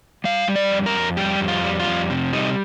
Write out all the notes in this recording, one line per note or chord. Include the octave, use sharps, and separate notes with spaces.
G3 F5
G3
D5
F2
A#4
F2
G3 G4
F2
F4
G3
F4
F2
C3
G3 D#4